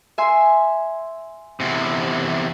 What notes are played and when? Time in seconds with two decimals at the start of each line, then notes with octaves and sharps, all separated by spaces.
0.18 E5 G#5 C6
1.60 E2 C3